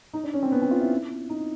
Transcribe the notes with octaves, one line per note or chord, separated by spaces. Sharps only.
D#4
D4
C#4
C4
B3
C4
F4
E4
D#4